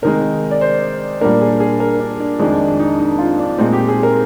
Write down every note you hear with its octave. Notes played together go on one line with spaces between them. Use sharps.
C3 D#3 G#3 A#4
D5
C5
A#2 G3 A#3 D4 A#4
G#4
G#4
A#4
D4
D4
F2 D#3 G#3 D4
D4
D#4
D#4
F4
D4
A#2 G#3 C4 D#4
G4
G#4
A#4